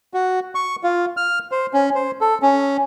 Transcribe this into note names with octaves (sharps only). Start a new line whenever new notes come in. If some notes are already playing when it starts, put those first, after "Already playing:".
F#4
C#6
F4
F6
C5
C#4
C5
A4
C#4